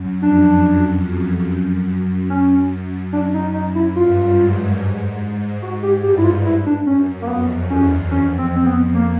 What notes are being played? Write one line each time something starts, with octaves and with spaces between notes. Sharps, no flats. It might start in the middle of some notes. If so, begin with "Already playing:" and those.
Already playing: F#2
F2 D4
F2
F#2
F#2 C#4
D4
D#4
D#4
E4
G2 F4
G#2
G#2 F#4
G4
G2 G4
E4
F4
E4
D4
F#2 C#4
A#3
F2 B3
E2 C#4
F2 C#4
C4
C4
B3
A#3